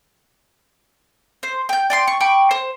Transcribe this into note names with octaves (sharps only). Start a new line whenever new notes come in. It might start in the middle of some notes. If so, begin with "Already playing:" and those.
C5
G5 G6
D5 G5 C6
C#6
G5 B5 C#6 D6
C5